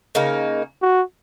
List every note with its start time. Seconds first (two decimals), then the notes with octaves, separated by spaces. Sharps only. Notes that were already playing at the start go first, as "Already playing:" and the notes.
0.15 C#3 A#3 D#4
0.82 F#4